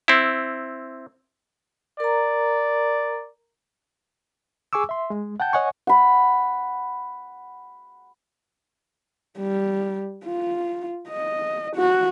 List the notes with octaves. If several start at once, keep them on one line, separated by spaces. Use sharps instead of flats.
C4 E4
A#4 D5 A#5
G#4 G#5 C#6 D6 E6
E5 C6
G#3
F#5 G5 A5 G6
C#5 D#5 F#5 G#5 C#6
F#5 B5
G3
F4
D#5
F#4